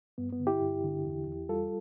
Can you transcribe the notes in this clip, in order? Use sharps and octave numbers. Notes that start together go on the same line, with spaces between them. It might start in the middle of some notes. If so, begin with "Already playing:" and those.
G2 B3
B3
D3
E4 G4
G2
D3
E2
E2
G3 F4 A4